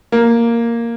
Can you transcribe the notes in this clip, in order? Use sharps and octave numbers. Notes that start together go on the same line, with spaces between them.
A#3